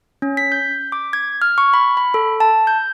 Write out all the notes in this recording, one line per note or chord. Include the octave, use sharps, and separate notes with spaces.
C#4
B6
G6
D6
G#6
F6
C#6
B5
B5
A4
A5
G6